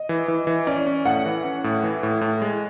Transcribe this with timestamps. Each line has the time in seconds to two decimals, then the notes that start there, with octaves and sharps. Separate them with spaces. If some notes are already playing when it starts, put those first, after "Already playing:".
Already playing: D#5
0.09 E3
0.28 E3
0.47 E3
0.67 C#4 D5
0.86 C#4
1.05 A2 F#5
1.26 E3
1.44 C#4
1.64 A2
1.84 E3
2.03 A2
2.21 A2
2.42 G#3